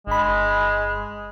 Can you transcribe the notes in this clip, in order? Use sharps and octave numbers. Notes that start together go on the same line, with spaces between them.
G1 G#3 B5